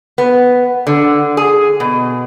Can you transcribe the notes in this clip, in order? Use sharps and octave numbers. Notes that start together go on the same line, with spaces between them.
B3
D3
G#4
B2